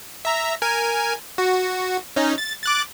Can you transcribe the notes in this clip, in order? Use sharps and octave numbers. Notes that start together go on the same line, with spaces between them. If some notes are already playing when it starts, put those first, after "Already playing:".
E5 A#5
A#4 G#5
F#4
C#4 D#4
A6
D6 F#6 A6